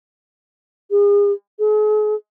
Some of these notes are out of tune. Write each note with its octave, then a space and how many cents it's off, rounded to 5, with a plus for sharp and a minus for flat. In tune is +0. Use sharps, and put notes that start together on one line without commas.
G#4 -35
G#4 +40